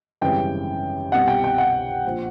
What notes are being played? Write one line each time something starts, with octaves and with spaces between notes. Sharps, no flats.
G#1 F#2 C#3 E3 G3 G5
C2 B2 G3 F#5
G5
G5
F#5
A#1 F3